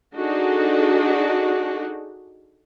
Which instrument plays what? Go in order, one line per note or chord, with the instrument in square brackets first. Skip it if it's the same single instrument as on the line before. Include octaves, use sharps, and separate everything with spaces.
[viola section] D4 D#4 F#4 G#4 A4